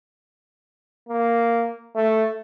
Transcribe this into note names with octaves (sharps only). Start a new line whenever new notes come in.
A#3
A3